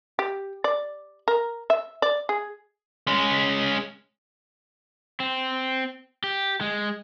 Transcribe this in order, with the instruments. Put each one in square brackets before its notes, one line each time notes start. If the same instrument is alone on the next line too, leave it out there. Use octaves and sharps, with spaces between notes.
[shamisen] G4
D5
A#4
E5
D5
G#4
[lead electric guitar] G#3 C#4
[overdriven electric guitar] C4
G4
G#3